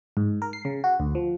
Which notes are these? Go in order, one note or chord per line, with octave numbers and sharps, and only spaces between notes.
G#2
A#4
C7
C#3
F#4
D2
F3